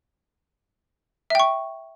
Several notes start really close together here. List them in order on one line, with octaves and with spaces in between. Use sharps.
E5 G5 C#6